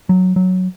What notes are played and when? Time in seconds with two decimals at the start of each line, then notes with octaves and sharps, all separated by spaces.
0.09 F#3
0.36 F#3